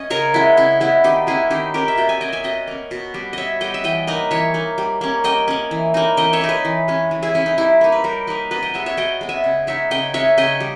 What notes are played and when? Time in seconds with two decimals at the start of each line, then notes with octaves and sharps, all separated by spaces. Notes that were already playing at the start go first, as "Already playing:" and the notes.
Already playing: C#4 D#5
0.10 C#3 A#4 C#5
0.34 G#3 B3 E4
0.57 C#3 E4
0.81 G#3 B3 E4
1.04 D#3 D#4 G4
1.27 G#3 C#4 E4 G#4
1.51 D#3 D#4 G4
1.74 G#3 C#4 G4 A#4
1.88 E5
1.97 B2 G5
2.09 E5 G#5
2.21 A#3 C#4 D#5 G5
2.32 E5 G#5
2.44 B2 D#5 G5
2.68 A#3 C#4
2.91 B2
3.14 G3 B3
3.33 B2 C#5 D#5 E5
3.61 G3 B3 D#5 G5
3.74 E5
3.84 E3 D#5 G5
4.07 A#3 D#4 B4 D#5
4.31 E3 C#5 E5
4.54 A#3 D#4
4.78 G3
5.01 A#3 C#4
5.24 G3 D#5 G5
5.48 A#3 C#4
5.71 E3
5.94 A#3 D#4
6.17 E3 D#5 G5
6.33 C#5 E5
6.41 A#3 D#4
6.49 B4 D#5
6.65 E3
6.88 G#3 C#4
7.11 E3
7.23 E4 G#4
7.34 G#3 C#4 E4
7.46 D#4
7.58 G3 E4
7.81 A#3 D#4
7.92 B4
8.04 G3 G4 A#4
8.27 A#3 D#4 B4 D#5
8.51 B2 B4 D#5
8.62 D#5 G5
8.74 G#3 B3 C#5 E5
8.86 C#5 E5
8.97 B2 D#5 G5
9.21 G#3 B3
9.29 E5 G#5
9.44 C#3
9.67 G#3 D#4 C#5 E5
9.91 C#3 D#5 G5
10.14 G#3 D#4 C#5 E5
10.38 C#3 D#5 G5
10.60 G3